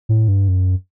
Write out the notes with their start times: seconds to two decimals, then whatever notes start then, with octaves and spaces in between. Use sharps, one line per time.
0.09 A2
0.28 G2
0.48 F#2